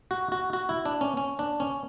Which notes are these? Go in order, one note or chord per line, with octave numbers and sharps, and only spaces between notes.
F#4
F#4
F#4
E4
D4
C#4
C#4
D4
C#4